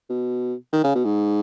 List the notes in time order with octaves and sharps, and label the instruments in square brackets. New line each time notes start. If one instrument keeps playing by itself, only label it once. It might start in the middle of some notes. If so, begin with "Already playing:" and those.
[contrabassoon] B2
D#3
C#3
B2
G#2